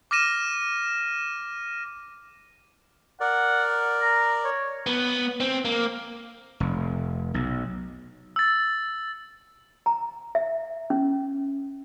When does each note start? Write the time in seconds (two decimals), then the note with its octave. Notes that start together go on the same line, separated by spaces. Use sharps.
0.11 D6 F6 A#6 D#7 E7
3.20 A#4 D5 F#5
4.01 A#5
4.44 C#5
4.86 B3
5.40 C4
5.65 A#3
6.60 F1
7.34 B1
8.36 E6 A6
9.86 A#5
10.35 E5
10.90 C#4